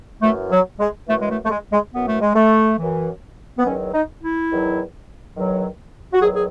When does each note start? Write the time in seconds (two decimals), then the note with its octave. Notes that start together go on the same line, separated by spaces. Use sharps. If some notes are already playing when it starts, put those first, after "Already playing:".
0.22 F#2 E3 A3
0.52 F#3
0.80 G#3
1.08 F#2 E3 A3
1.20 G#3
1.30 A3
1.45 A3
1.51 G#3
1.73 G#3
1.94 F#2 E3 B3
2.08 A3
2.22 G#3
2.35 A3
2.79 F#2 E3
3.58 B3
3.66 E2 D#3 F#3 C#4
3.94 D#4
4.23 E4
4.51 E2 D#3 F#3
5.36 E2 D#3 F#3
6.14 F#4
6.22 E2 D#3 F#3 G#4
6.34 G#4